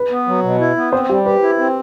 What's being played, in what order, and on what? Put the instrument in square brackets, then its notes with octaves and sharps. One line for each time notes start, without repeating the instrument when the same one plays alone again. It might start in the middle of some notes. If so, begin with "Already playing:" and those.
Already playing: [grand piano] B4
[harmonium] B3
F#3
B2
E4
B3
[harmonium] C4 [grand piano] C5
[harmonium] G3 [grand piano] G4
[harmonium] G4 [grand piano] B4
[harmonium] E4
C4